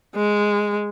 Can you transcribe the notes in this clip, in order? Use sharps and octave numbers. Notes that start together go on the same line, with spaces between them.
G#3